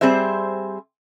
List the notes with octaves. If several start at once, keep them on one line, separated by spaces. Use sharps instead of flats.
G3 C4 G#4 C5 E5